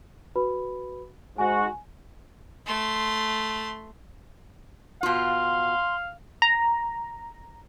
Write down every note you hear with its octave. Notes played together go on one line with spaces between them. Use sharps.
F#4 B4 B5
G#2 F#4 G#5
A3 C6
B2 F4 F5 C6
A#5